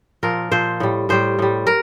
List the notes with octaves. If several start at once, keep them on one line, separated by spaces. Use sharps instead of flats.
A#2 F3 A#4
A#2 F3 C5
A2 G3
A2 G3 C5
A2 G3
A#4